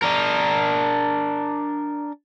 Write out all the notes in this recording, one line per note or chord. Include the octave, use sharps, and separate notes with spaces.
D4 A#4